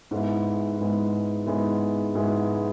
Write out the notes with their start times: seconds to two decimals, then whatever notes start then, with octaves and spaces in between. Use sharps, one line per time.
0.11 G#2 G#3 B3 E4
0.78 G#2 G#3 B3 E4
1.47 G#2 G#3 B3 E4
2.15 G#2 G#3 B3 E4